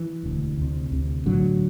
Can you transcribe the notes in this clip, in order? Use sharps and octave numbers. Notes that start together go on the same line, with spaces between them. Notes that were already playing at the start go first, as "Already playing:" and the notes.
Already playing: E3
E1 D2 D3
D2 C3
D2 C3
B1 A2 D3 F#3